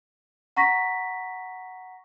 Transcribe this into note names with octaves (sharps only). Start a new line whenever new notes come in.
F#5 A#5 C#6 A#6 B6